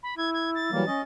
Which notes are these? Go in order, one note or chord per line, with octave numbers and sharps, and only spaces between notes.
B5
E4 G#6
G#6
A6
E3 F#3 G3 A#3
C#4 D#5